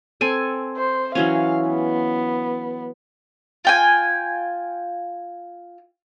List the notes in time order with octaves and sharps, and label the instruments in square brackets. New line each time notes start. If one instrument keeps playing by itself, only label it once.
[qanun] C4 A4 G#5
[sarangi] C5
[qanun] E3 F#3 C#4 [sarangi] F5
[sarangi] B3
[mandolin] F4 G5 G#5